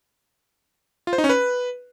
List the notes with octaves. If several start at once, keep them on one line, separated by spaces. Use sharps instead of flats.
F4
C5
D#4
C#4
B4